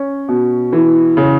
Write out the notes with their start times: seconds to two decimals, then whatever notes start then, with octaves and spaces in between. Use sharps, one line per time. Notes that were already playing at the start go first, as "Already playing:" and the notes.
Already playing: C#4
0.28 B2
0.73 E3
1.17 C#3